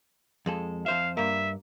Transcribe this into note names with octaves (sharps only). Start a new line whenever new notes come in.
F2 G#3 A4
F2 C5 E5 F5
G2 A#3 E5